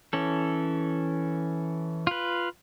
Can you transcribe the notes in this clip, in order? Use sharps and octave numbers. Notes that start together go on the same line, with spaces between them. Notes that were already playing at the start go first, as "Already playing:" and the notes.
E3 C#4 A4
F4 B4